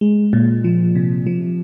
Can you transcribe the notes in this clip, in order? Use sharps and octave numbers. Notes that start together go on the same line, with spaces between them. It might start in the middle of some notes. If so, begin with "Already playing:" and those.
G#3
A#2
F3
C3
F3